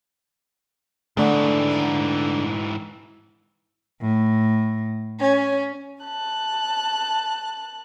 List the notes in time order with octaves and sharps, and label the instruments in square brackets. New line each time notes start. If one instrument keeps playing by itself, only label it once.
[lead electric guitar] G#2 E3 [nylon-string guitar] D3 A3
[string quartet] A2
C#4
A5 F#6